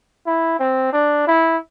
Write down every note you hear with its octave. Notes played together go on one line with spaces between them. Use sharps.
E4
C4
D4
E4